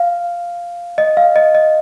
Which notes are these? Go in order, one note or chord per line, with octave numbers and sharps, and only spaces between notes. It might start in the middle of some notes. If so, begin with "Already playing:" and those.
Already playing: F5
D#5
F5
D#5
D#5